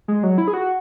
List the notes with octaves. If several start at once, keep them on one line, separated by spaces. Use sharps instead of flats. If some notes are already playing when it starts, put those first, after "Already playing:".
G#3
F#3
E4
G#4
F#4